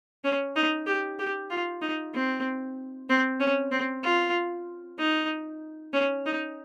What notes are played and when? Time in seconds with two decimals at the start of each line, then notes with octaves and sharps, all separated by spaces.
0.24 C#4
0.56 D#4
0.87 G4
1.19 G4
1.50 F4
1.82 D#4
2.14 C4
3.09 C4
3.40 C#4
3.72 C4
4.03 F4
4.99 D#4
5.93 C#4
6.26 D#4